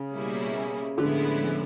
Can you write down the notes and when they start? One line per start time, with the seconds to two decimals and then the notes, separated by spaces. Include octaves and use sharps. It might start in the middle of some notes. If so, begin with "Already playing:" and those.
Already playing: C#3
0.13 B2 G3 A#3 C#4 E4
0.98 A2 D3 F3 G#3 B3 E4